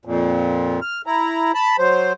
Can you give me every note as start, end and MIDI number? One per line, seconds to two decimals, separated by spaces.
0.05 0.80 41
0.05 0.80 46
0.82 1.02 89
1.06 1.52 64
1.06 1.52 82
1.54 1.76 81
1.54 1.76 83
1.79 2.13 54
1.79 2.13 72